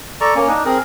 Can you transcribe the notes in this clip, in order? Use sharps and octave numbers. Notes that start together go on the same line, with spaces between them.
A4 D5 A#5 C#6
A#3 C#4
D4 D#4
C4 G#4 A#4